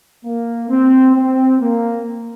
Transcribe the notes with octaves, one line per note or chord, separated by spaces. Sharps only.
A#3
C4
C4
A#3